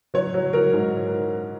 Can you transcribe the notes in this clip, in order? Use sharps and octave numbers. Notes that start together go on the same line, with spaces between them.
F#3 C#5
F#3
F#3 A#4
G#2